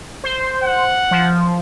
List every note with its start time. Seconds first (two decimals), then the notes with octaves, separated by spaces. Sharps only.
0.24 C5
0.63 F#5
1.11 F3